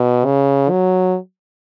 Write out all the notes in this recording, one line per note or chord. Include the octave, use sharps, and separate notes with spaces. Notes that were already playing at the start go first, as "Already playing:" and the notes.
Already playing: B2
C#3
F#3